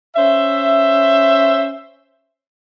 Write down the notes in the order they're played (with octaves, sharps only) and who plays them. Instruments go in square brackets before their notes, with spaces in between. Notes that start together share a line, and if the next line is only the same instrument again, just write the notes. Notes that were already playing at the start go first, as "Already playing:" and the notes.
[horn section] C#4 C5 E5